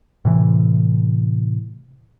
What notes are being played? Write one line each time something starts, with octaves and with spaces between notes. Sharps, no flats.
A2 C3 E3